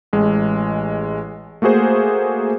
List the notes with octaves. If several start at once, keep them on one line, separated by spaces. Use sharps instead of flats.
A1 G#3
A3 A#3 F#4 G#4 C5